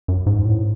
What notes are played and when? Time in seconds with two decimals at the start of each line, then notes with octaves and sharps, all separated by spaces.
0.08 F#2
0.26 G#2
0.45 A2